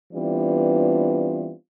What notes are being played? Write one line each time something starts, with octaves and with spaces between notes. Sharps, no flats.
E3 G3 B3 C4 D4 F4